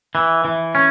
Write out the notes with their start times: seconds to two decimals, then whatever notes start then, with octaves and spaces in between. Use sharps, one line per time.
0.15 E3
0.45 E3
0.75 C#4